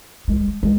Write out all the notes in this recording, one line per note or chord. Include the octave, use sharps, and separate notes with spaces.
G#3
G#3